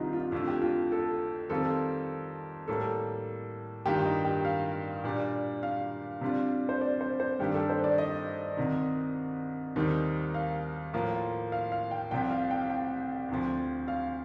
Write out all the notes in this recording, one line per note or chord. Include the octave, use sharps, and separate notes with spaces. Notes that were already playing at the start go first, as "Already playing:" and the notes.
Already playing: C2 C3 D#3 G3 D4 D#4 F4
F4
F2 D3 A3 F4
G4
F4
A4
F2 D#3 G3 C4 F4 A4
A2 G3 A#3 A4
G2 D#3 A#3 F4 G4
D#4
G4
F5
A#2 G3 D4
F5
C3 G3 D4 F4
C5
D5
C5
C5
G2 D#3 G3 D4 G4
A4
C5
D5
D#5
C2 C3 D#3
D#2 D#3 G3 C4 D#4
F5
A2 F3 A#3 F4
F5
F5
G5
C2 C3 F3 G5
F5
G5
F5
G5
D2 C3 F3
F5